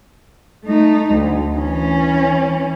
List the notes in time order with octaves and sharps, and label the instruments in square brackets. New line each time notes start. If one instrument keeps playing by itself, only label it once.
[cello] A3 D#4
D2
E3 C#4